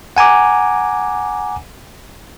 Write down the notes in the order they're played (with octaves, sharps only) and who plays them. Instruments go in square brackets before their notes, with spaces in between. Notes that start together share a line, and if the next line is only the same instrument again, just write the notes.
[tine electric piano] F#5 G#5 A#5 D6